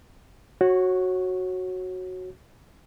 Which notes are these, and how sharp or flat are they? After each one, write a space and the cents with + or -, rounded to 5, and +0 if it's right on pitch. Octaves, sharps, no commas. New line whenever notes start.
F#4 +0 C#5 -25